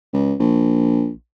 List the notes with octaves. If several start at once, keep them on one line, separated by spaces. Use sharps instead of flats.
C#2
A#1